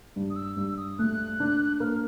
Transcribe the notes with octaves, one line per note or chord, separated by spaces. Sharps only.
G2
D#6
E6
G2 E6
D#6
A3 F#6
D4
A#3 F6